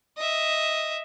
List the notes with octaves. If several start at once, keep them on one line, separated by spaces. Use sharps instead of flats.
D#5 E5